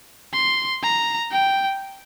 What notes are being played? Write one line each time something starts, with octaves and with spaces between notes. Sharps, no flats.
C6
A#5
G5